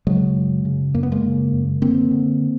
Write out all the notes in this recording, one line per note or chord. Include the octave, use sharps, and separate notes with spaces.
C#3 F#3 G#3
F#2
C#3
F#2 A#3
B3
G#3 A#3
C#3
F#2
D3 A#3 C4
D3